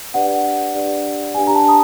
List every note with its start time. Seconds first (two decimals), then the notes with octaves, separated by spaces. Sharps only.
0.14 D4 G4 B4 D5 F#5
0.74 D4 G4 B4 D5
1.35 D4 G4 B4 D5 G#5
1.47 A#5
1.55 A5
1.68 D#6